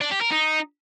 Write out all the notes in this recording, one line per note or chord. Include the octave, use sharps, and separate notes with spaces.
D4
G4
A#4
D#4